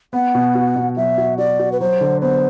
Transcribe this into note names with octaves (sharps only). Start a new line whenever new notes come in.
B3 F#5
B2
F#4
B2
F#3 E5
F#4
F#4 D5
F#4
B4
F#3 C5
D3
B3 C5